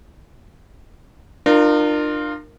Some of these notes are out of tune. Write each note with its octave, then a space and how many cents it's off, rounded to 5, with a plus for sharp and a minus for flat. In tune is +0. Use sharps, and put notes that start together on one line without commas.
D4 +45 F4 +0 A#4 +0